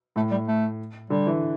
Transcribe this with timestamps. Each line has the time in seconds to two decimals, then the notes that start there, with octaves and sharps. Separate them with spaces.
0.16 A2 A3
0.31 G3
0.48 A3
1.10 D3 G3
1.27 E3